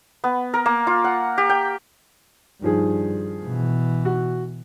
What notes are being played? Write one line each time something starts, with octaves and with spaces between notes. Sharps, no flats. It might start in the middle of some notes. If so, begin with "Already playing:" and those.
B3
A#4
A#3
F4
F#5
G4
G5
G2 D#3 F3 G#4
B2 E3
F#4